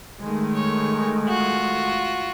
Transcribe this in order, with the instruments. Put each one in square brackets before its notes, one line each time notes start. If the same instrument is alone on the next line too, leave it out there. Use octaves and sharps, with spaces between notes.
[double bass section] D#3 G#3 A3
[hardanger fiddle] C#5
F4 F#4